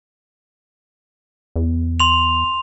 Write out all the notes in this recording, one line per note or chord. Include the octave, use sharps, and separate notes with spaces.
E2
C6 F7